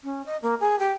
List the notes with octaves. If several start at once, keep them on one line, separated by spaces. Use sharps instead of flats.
C#4
D#5
A#3
G#4
G4